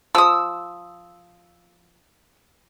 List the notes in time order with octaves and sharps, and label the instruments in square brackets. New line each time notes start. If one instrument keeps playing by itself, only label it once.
[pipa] F3 [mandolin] D#6 E6